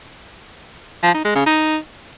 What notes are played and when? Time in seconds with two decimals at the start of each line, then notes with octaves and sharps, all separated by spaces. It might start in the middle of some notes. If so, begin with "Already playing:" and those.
1.03 F3
1.14 D#4
1.25 G#3
1.35 C#3
1.46 D#4